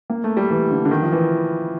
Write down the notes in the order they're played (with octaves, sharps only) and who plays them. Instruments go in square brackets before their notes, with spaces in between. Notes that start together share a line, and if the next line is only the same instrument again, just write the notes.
[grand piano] A#3
A3
G3
E3
D3
D3
D#3
F3
E3